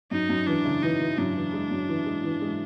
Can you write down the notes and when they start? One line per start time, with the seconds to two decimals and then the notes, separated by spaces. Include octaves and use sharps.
0.11 F#2 D#4
0.29 F#2
0.47 E3 D4
0.65 C#3
0.83 E3 D#4
1.00 E3
1.18 F#2 D4
1.35 E3
1.53 G#3
1.71 F#2
1.89 E3
2.06 G#3
2.24 E3
2.42 G#3